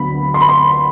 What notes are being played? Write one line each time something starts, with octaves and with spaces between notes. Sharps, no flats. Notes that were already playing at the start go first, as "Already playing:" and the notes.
Already playing: D2 D3 F#3 B3 B5
C6
B5
C6